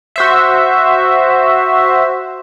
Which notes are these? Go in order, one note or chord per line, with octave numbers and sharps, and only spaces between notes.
F#4 C5 E5